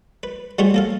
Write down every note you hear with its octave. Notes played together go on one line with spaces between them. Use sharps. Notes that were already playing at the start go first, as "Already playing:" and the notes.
B4
G3 A3 F#4 G#4 C5 C#5
A#3 A4 F5